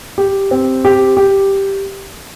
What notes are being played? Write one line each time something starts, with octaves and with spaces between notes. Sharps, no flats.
G4
C4
G4
G4